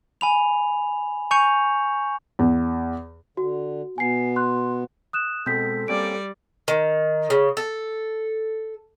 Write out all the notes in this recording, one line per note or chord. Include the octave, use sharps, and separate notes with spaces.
G#5 B5 F7
G#5 C#6 G6 C#7 F7
E2
D3 F#4
B2 B3 G#5 C7
C6 F#6
D#6 F#6 E7
B2 G#3 C4 A4 G6 B6
G3 A#3 C4 C#4 D5 D7
D#3
C#3
A4